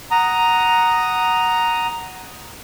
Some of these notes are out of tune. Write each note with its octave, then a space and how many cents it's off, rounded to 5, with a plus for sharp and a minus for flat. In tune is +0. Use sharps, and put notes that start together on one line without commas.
F#5 +0 A#5 +0 D#6 +0